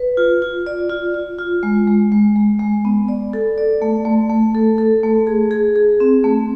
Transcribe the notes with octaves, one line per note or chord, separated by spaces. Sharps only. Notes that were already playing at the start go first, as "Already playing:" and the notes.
Already playing: B4
F4
F4
D5
F4
F4
F4
G#3
G#3
G#3
G#3
G#3
B3
D5
A4
D5
A3
A3
A3
A4
A4
A3
G#4
G#4
G#4
C4
A3